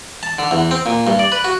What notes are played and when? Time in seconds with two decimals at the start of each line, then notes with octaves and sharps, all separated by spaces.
0.23 A5
0.39 D3
0.51 E2
0.71 C4
0.86 A#2
1.07 G2
1.19 D5
1.32 B4
1.44 F#4